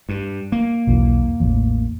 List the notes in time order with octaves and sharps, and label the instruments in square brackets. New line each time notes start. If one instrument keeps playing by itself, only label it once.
[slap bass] G2
A#3
[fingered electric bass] B1 E2 E3
A1 E2